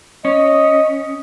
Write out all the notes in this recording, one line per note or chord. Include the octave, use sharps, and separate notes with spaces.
C#4 D#5